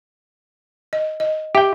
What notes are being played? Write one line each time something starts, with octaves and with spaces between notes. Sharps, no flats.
D#5
D#5
G4 E5 G5